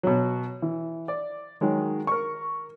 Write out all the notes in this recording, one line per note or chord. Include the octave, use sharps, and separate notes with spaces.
B2 F#3
E3
D5
D#3 F#3 G#3
A#4 C#6